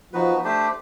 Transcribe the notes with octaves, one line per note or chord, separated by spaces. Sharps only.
F3 B3 D#4 F#4 B4
A3 D4 G4 C5